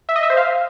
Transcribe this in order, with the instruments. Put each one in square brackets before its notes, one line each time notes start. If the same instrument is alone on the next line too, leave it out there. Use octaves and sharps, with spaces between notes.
[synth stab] E5
D#5
E5
C5
F5